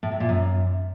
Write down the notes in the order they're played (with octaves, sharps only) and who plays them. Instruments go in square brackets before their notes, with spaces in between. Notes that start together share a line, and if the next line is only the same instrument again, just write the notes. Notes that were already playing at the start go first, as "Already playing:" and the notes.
[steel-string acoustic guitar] A2
C3
A#2
F#2